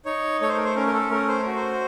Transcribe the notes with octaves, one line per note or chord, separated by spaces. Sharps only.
D#4 C#5
A3 C#5
C5
A#4
C5
C#4 A#4
A#4
A4
A3 A#4
C5
F#4 A#4
C5